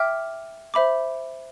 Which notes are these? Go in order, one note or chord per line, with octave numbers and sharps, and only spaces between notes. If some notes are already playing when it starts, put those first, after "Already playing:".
Already playing: E5 G5 D6 F6
C5 E5 B5 D6